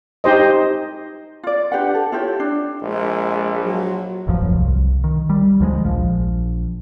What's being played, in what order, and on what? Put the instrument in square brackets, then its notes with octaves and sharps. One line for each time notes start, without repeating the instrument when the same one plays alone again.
[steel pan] D#4 G4 C5 D#5
[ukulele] F4 D5
D4 G4 B4 F#5
A4
E4 F4 G4 C#5
D4 E4
[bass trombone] A#1 [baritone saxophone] G#3
[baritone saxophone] F#3
[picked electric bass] D#1 A1 F#2 F3
C2
D#3
G3
D2 F3 F#3 G#3
A#1 F3